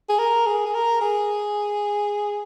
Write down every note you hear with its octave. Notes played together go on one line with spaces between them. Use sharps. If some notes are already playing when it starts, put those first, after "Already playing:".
G#4
A#4
G#4
G#4
A#4
G#4